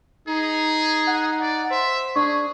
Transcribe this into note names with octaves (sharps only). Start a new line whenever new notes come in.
D#4 G#4
F#5
D5
C5 E5
D4 G#4 C#6